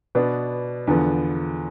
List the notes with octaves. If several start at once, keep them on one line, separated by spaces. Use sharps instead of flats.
B2 B3 D4
E2 D3 F3 B3